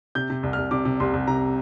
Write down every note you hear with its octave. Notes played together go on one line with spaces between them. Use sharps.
C3 G6
C3
C2
C2 F6
C3 D6
C3
C2 C6
C2
C3 A#5